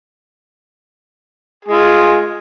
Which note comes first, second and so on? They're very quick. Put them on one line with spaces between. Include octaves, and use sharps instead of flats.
G#4 G#3 F4